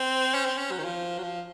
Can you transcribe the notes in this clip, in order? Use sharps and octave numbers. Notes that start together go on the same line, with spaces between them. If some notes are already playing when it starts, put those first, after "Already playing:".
Already playing: C4
C#4
C4
C#4
F#3
D#3
F3
F#3
F3